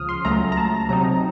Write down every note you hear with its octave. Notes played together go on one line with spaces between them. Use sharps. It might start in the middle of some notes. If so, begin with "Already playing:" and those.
Already playing: C#2 C#3 F3 D#6 F6
C6
C#2 C#3 F#3 A3 A#5
A#5
A5
C3 F#3 C4 D#4 A#5